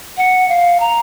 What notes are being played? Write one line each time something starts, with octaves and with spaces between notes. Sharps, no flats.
F#5
F5
A#5